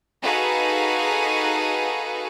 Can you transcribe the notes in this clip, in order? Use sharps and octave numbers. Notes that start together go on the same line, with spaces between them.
D#4 F#4 G#4 A4 B4 F5